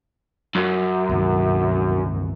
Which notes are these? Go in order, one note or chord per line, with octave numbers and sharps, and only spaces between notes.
F#2
C#2 G2 D#3